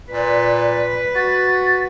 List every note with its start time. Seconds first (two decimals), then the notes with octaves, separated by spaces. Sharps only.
0.11 A#2 B4 D5
1.16 F#4 A6